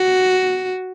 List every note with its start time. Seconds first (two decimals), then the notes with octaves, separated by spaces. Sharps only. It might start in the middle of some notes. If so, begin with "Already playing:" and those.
Already playing: F#4